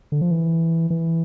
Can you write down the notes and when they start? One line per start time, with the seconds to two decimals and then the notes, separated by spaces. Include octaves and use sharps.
0.12 D3
0.21 F3
0.31 E3
0.90 E3